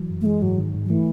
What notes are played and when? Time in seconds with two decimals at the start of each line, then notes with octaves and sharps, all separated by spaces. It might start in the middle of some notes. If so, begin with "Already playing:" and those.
Already playing: E3 F#3
0.10 F#2
0.21 A3
0.25 E3 G#3
0.42 G#2 F#3
0.58 D#3
0.74 G#2
0.85 F#3
0.90 E3 A3